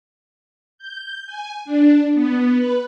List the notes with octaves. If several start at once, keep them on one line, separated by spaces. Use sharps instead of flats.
G6
G#5
D4
B3
B4